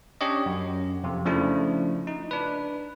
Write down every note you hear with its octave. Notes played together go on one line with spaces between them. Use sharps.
C#4 D4 G4 C#5 D#5
F#2
F2 C3
C#3 F3 A3 D4 E4
D#4
D4 B4